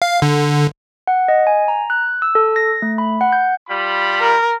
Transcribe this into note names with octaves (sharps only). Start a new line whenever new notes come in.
F5
D3
F#5
D#5
G#5
A#5
F#6
E6
A4
A#6
A3
B5
F#5
G6
G3 F4 B5
A#4